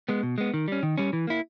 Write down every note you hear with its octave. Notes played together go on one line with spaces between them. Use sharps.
G#3 B3
B2
G#3 B3
D#3
G3 C#4
D#3
G3 C#4
E3
A#3 E4